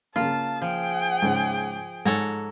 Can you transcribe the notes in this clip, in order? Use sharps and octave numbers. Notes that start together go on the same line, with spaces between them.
C#3 A#3 F4 A5
F3 G#4 G5
G#2 C#3 C5
G#2 A4 C#5 F#5 G#5 A#5